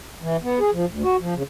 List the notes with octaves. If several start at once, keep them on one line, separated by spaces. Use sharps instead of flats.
E3
B3
G#4
F3
D2
F#4
F3
C#3